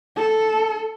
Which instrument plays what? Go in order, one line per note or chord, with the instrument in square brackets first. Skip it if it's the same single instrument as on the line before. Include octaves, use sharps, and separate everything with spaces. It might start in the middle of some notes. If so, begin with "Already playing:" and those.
[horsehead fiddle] A4